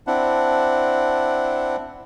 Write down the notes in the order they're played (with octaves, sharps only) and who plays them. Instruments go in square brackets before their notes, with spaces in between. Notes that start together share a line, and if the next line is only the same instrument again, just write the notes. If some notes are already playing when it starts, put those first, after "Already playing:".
[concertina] C4 D4 E4 F#5